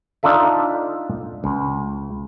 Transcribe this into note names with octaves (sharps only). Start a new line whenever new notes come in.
D4 D#4 F4 A4 E5
C#2